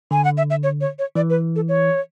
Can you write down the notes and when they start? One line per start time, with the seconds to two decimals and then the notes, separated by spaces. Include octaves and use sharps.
0.11 D3 G#5
0.25 F#5
0.37 E5
0.50 E5
0.63 C#5
0.81 C#5
0.99 C#5
1.16 E3 D5
1.30 B4
1.56 A4
1.69 C#5